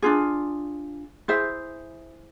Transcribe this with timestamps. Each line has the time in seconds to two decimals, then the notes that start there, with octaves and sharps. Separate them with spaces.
0.02 D4 F4 G#4
1.28 E4 G#4 C5 E5